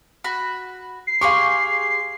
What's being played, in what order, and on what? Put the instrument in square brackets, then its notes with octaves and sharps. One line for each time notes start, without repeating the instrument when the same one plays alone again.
[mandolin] F#4 B5
[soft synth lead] C7
[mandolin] G4 G#4 C6 [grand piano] F5 C#6